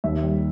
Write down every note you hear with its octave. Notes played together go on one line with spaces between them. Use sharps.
D#2 E5
G3